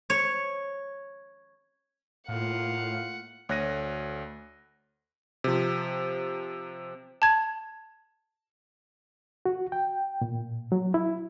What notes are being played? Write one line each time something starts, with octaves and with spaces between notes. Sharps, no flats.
C#5
A2 A#3 F4 F5 F#5
D2 C#5 F#6 A#6 D#7
C3 F3
A5 G#6
F#4
G5
A#2
F#3
E4